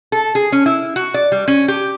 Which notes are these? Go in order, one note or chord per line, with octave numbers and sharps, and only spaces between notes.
A4
G#4
C#4
E4
F#4
D5
G3
C#4
G4